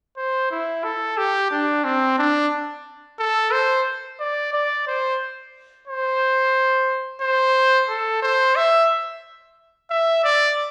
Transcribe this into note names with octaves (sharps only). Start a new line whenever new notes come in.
C5
E4
A4
G4
D4
C4
D4
A4
C5
D5
D5
C5
C5
C5
A4
C5
E5
E5
D5